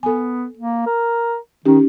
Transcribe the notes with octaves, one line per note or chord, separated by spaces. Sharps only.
B3 A4 G#5
A#3
A#4
D#3 C#4 D#4 G4